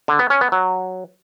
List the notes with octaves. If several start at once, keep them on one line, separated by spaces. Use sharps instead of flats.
D3
B3
C#4
B3
F#3